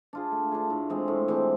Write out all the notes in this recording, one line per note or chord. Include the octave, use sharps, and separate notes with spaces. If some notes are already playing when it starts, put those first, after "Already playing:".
D4 F4 G#4
A3
D4 F4 G#4
A2
E3 G#3 C4
A2
E3 G#3 C4